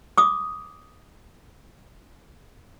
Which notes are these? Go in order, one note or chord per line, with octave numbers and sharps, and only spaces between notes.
D6 D#6